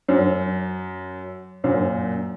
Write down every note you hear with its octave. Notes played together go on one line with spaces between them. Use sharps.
F#2
F#2 A#2